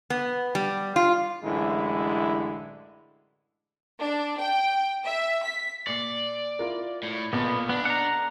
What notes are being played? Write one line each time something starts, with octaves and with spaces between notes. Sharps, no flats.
B3
G3
F4
A1 F#2 D3 G#3 E4
D4
G5
E5
B6
A#2 D5 C7 C#7
E4 F4 A#4
A2
B1 A#2 B3 A5
B3 D4
F#5 A#5